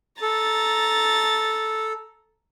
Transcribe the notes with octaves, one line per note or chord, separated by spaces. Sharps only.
A4 A#5 A6